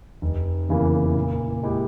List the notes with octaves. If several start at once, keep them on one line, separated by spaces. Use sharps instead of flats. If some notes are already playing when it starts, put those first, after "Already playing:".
F1
E2 C#3 E3 A#3
A#2
G#3 E4 G4